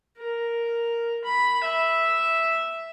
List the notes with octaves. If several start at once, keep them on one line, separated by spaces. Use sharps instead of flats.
A#4
B5
E5